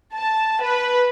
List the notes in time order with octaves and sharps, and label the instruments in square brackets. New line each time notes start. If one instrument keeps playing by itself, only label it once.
[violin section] A5
B4